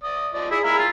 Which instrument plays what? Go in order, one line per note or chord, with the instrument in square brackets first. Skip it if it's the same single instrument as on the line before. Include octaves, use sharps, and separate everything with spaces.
[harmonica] D5 D#6
F3 D5 D#5
[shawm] E4 [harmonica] G#4
[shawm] E4 [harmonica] G#4 F5 A#5
[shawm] F4